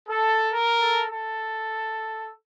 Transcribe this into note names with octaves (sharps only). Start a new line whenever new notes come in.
A4
A#4
A4
A4